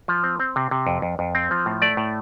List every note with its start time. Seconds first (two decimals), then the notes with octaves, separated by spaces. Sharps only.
0.08 F3
0.24 C4
0.39 C4
0.56 C3
0.71 C3
0.87 F2
1.02 F2
1.19 F2
1.35 C4
1.51 F3
1.66 A2
1.82 A3 D5
1.97 A2